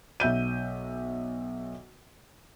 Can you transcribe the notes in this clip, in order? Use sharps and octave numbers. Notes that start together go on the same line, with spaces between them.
B1 E5 G6 D#7